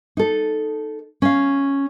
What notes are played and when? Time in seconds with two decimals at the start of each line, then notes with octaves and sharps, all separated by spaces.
0.17 D#4 A4
1.22 C#4 F5